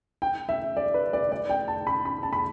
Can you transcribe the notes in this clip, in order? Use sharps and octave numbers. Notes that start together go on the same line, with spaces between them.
G5
E5
D5
B4
D5
D5
G5
A5
B5
B5
A5
B5